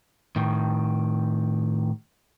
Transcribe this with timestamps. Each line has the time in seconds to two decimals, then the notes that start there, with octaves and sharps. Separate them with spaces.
0.36 A2 D#3